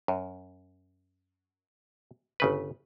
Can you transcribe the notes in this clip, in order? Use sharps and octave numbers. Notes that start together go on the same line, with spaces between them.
F#2
G1 C#3 B4